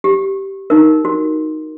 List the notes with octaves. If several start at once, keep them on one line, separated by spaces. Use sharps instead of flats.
G4
D#4 A#4
F#4